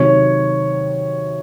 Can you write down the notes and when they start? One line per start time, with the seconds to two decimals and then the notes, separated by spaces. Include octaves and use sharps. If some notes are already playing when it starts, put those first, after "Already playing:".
Already playing: C3 D#3 F#3 C#5